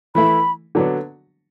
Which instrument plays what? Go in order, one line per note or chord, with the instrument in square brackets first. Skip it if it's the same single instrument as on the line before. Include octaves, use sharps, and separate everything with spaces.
[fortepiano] E3 A3 E4 [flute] B5
[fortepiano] D3 F#3 B3 D4